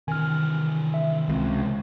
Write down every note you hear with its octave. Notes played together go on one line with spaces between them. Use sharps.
C3 D#3 E3 G#5 F6
E5
C#2 G#3 C4